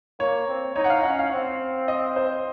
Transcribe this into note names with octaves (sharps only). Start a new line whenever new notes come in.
A#3 C#5
C4
D#4 C#5
F#5
F5
C#4 F#5
F5
C4
D#5
C5